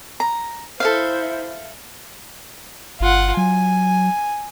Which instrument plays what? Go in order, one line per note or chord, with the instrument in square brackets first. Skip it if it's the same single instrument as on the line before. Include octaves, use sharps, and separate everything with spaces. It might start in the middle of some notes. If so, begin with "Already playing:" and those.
[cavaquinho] A#5
[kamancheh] E4 C5 [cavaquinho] A4 E5 F5
[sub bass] G1 [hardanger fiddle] F4 F#5
[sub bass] F#3 [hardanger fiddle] G#5